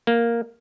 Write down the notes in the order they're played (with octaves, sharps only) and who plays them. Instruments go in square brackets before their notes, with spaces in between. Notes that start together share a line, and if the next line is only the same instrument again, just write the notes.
[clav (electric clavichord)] A#3